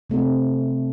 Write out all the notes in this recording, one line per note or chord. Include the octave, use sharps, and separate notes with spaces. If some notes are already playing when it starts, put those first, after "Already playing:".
C3 A3 C4 A4